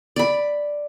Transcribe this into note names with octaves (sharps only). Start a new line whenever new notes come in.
D5 B5